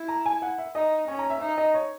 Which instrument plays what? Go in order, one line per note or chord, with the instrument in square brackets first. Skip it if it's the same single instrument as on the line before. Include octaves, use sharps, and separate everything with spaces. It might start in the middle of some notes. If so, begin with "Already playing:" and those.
Already playing: [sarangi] E4
[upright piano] A#5
G#5
F#5
E5
[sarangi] D#4 [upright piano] D#5
[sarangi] C#4 [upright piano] C#5
[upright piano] A#5
E5
[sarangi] D#4 [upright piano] E5
[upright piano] D#5
C#5